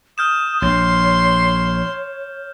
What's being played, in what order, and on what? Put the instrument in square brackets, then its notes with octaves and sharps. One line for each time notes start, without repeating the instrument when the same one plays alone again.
[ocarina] D#6 [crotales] F6 G6 E7
[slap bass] A#1 [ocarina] C#5 [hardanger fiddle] C6